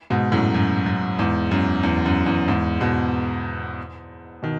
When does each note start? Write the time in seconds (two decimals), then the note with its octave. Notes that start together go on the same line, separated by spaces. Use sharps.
0.10 G#2 B2
0.32 F#2 A2
0.54 F#2
0.86 F#2
1.19 E2 G#2
1.51 F#2
1.83 E2
2.06 F#2
2.26 E2
2.48 E2 G#2
2.80 G#2 B2
4.42 B2 D#3